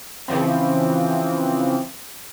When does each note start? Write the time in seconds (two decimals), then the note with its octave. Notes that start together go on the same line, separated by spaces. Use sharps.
0.28 C#3 E3 F3 C4